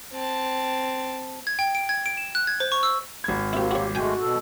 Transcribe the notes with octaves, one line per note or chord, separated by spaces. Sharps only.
C4 A5
G#6
G5
D7
G#6
D7
E7
F#6
G#6
C5
C#6
E6
G#1 G#6
A#3 C4 E4 F#4 G4
F#4 G4 C#5
G#3 A3 F#4 G5 G#5
B2 A4